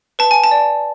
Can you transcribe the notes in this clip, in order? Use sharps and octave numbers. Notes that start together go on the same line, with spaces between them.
B4 A5
G#5
A5
D5